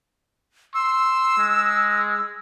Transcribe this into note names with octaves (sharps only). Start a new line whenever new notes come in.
C6 E6
G#3